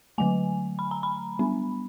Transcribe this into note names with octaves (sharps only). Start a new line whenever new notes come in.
D3 F#3 A3 G#5
B5
A#5
B5
G3 B3 D4